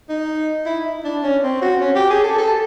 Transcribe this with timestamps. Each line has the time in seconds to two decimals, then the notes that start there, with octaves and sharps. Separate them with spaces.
0.09 D#4
0.66 E4
1.05 D4
1.24 C#4
1.43 C4
1.62 F#4
1.81 C#4
1.95 G4
2.10 G#4
2.24 A4
2.38 A4